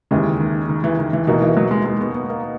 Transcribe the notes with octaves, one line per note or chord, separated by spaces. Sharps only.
D#2 C#3 E3 G#3
D#3
D#3
E3
D#3
E3
B2 E3 A#3 D#4 F#4
E3
F#3
G#3
G#3
B3
B3
A#3